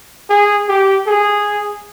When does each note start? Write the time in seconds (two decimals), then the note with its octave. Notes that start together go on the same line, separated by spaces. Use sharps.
0.29 G#4
0.68 G4
1.07 G#4